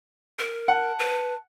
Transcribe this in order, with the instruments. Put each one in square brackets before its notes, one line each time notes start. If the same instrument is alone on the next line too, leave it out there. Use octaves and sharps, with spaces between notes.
[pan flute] A#4
[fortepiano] F#5 [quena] A5
[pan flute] B4